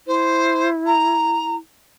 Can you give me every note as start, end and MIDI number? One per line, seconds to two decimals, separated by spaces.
0.07 1.59 64
0.07 0.68 72
0.86 1.55 82